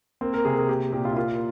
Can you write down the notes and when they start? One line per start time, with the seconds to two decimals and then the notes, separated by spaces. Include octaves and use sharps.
0.21 A#3 C4
0.34 A#4
0.45 C3 G#4
0.57 G#4
0.69 A#3 G4
0.92 A#2 G4
1.05 F4
1.12 E4
1.16 A#3 F4